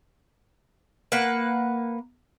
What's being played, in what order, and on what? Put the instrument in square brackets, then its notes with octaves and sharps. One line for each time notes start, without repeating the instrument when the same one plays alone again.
[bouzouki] A#3 B4 F#5